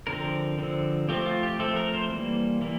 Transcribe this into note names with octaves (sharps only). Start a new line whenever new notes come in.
D3 F3 C4 A#4
D3 F3 C4
F3 A3 C4 G4
F4
G4
F3 A3 C4 A4
A#4
C5
E3 G3 A#3
E3 G3 A#3